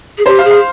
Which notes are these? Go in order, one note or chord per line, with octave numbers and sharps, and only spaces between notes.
G#4
G4 C5
F5
G#4
F5